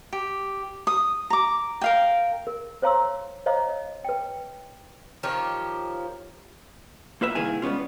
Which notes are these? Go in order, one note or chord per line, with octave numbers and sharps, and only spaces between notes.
G4
D#6
A#5 D6
A#4 F5 G5
A#4
C5 C#5 F5 A#5 C6 E6
C5 C#5 D#5 F5 A#5
D#5
B4 G5
D#3 F3 G4 C#5
A#3 F4 B4 E5
C2 D#3 A#3 E4 G#4 G#5
G3 G#3 B3 C#4 F4